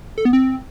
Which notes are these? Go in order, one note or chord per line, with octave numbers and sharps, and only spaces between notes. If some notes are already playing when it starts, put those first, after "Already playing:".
A4
B3
C4